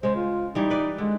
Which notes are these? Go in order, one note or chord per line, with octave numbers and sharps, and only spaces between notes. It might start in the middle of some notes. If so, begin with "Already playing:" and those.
C#3 G#3 C5
F4
E3 G3 D#4 C#5
B4 D5
D3 G#3